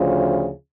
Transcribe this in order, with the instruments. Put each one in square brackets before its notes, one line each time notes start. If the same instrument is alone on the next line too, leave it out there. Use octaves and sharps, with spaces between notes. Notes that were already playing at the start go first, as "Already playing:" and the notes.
Already playing: [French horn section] D2 C#3 F3